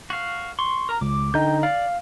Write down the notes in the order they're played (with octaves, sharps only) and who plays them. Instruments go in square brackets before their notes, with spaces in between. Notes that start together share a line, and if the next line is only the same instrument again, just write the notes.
[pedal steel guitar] F#4 F5
C6 C#6
A#4 A#5
[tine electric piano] C#2 [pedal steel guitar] D6
[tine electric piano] D3 D#4 [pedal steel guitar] G5 G6
[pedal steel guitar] D5 [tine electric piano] F5